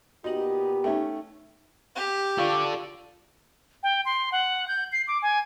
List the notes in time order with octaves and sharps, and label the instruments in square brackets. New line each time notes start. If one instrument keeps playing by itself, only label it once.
[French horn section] A#2 B3 G4 [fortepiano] D#4 D#5 [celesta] F#4 F#7
[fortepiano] A3 C#4 [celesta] D#4 E5 G5
[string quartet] G4
[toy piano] F4 F5 C#6 [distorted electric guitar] A4 D5
[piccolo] G5
C6
F#5
G6
C7
D6
G#5